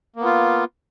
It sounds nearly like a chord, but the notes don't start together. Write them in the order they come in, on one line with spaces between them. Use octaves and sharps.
A#3 B3 F4